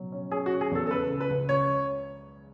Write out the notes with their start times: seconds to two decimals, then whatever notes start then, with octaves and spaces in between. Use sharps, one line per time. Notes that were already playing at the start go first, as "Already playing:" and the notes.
Already playing: B2 F#3
0.12 C#4
0.31 C#4 G#4
0.46 F#4
0.51 C#4
0.61 G#4
0.71 E2 A4
0.87 A4
0.90 C#3 B4
1.10 C#2
1.20 B4
1.30 C#2
1.49 C#2 C#5